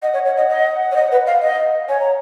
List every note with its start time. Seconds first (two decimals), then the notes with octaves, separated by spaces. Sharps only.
0.02 D#5 F#5
0.13 C#5
0.25 C#5
0.37 D#5
0.49 D#5
0.91 C#5
0.95 D#5
1.11 B4
1.26 F5
1.42 D#5
1.88 C#5 G#5
2.00 A#5